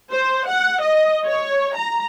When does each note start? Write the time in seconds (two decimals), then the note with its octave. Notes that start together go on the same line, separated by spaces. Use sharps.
0.12 C5
0.48 F#5
0.82 D#5
1.26 C#5
1.76 A#5